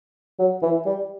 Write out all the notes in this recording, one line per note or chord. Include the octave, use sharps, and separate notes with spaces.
F#3
E3
G3